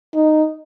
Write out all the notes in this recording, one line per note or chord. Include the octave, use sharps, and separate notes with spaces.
D#4